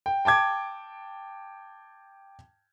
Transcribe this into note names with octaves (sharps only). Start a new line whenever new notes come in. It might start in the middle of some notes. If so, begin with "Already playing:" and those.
G5
G5 A5 D6 G#6